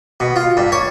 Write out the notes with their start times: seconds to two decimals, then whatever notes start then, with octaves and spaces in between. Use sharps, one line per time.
0.20 B2
0.36 F4
0.57 G2
0.72 C#5